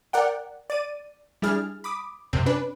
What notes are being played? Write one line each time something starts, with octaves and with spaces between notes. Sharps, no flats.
A#4 D5 F#5 G5
D5 A6 D#7
G3 D4 E4 G#4 F6 A6
B5 D6 D#6
F#2 C3 C4
C#4 D4 B4